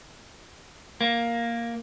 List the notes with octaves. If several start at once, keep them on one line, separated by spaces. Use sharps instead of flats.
A#3